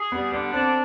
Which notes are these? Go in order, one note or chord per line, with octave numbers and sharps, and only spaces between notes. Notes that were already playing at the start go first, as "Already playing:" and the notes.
Already playing: G#4
G3 B3
D3 B3
C4 D4